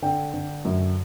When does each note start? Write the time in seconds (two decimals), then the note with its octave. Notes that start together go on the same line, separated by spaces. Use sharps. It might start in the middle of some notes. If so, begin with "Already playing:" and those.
0.02 D3 G5
0.34 D3
0.65 F#2